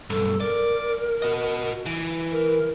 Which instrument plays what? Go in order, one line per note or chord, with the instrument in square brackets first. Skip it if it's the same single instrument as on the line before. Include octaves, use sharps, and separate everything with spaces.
[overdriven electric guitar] B1 G2 [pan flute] A4
[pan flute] A#4 [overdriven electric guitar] D5
[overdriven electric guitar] F#4 D#5
E3
[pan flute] A#4